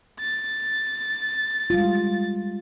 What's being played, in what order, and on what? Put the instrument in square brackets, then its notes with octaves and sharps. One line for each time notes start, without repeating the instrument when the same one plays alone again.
[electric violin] A6
[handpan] G3 G#3 F4